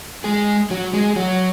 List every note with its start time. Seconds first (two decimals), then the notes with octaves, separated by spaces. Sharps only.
0.24 G#3 G#4
0.71 F#3 F#4
0.93 G#3 G#4
1.16 F#3 F#4